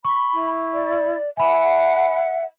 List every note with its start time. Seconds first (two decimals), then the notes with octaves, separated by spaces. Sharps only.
0.05 B5 C#6
0.33 E4
0.73 D5
1.37 E5 F#5 G#5 B5